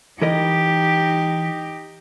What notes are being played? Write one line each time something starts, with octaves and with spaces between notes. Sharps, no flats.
E3 D#4 G4 A#4 D#5